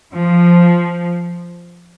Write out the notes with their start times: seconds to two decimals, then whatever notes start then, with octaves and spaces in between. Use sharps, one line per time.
0.13 F3